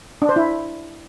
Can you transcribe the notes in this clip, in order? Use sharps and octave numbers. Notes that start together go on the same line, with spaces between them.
D4
C5
E4